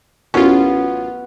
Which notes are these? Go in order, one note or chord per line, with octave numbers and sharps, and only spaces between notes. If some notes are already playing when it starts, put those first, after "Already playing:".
A1 F#2 B3 C#4 F4